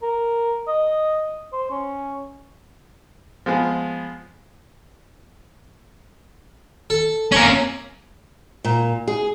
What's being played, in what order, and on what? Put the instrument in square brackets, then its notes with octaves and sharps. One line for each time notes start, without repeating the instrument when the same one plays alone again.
[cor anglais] A#4
D#5
C5
C#4
[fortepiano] F3 G#3 B3 G#4
[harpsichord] A4
[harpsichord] A#3 C6 C#6 [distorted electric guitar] C#4 A#4
[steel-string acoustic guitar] A#2
G#4